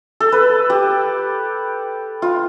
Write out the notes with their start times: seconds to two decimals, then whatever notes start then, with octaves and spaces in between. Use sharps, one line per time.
0.20 A4
0.32 B4
0.70 G4
2.22 F4